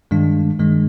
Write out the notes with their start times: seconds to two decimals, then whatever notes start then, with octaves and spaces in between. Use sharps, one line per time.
0.11 G2 D#3 G#3 D4
0.59 G2 D#3 G#3 D4